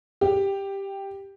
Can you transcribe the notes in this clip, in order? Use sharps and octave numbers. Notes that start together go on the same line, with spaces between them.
G4